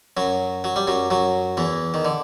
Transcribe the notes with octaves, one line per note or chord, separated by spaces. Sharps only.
F#2 F#3
F#3
G3
F#2 F#3
F#2 F#3
E2 E3
D#3
D3